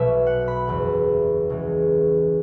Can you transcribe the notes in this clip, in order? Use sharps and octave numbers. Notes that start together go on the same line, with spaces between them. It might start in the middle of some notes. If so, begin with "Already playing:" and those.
Already playing: B1 B2 F#3 E5
F#5
B5
F#1 E2 C#3
C#2 C#3 E3